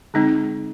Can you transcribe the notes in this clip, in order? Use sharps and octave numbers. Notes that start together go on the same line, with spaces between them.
D3 G#3 C4 D#4